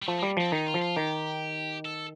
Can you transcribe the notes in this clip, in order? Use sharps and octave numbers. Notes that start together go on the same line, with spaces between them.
G3
F3 A3
G3 A#3
F3 C4
D#3 D#4
F4
F3
F4
D#3 G4
A4